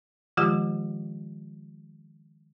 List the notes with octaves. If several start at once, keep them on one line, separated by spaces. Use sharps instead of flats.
D#3 F3 G#3 F4 G4